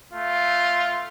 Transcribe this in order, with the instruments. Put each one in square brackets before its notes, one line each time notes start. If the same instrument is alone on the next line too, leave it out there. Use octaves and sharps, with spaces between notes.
[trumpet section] A3 F4